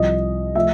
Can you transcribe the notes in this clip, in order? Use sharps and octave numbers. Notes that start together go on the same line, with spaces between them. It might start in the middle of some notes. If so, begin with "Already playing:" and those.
Already playing: C2 C3 F3 D#5
F3 A3 E5